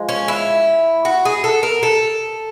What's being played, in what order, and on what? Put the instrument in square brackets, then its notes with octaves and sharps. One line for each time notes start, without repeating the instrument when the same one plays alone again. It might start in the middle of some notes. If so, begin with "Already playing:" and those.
Already playing: [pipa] F3 G#3
[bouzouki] C#4
E4
F#4
G#4
A4
A#4
A4